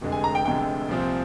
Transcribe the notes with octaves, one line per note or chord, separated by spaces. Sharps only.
F1 F2 D3 G#3
G#5
A#5
G5
F1 F2 D3 G#3 G5
C2 A#2 F3 C4